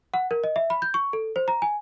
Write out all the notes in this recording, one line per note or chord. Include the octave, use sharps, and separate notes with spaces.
F#5
A#4
D#5
E5
B5
G6
C#6
A4
C5
A#5
G#5